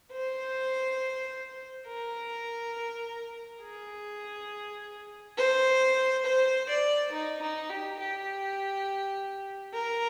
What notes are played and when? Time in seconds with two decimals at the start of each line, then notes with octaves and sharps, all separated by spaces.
0.13 C5
1.87 A#4
3.63 G#4
5.38 C5
6.25 C5
6.69 D5
7.12 D#4
7.42 D#4
7.70 G4
8.00 G4
9.74 A#4